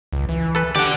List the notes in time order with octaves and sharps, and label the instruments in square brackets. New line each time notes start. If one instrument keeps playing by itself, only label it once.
[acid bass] C#2
E3
[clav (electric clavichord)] A4 B4
[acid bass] D3 [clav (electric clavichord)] G4 [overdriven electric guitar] D5 F#5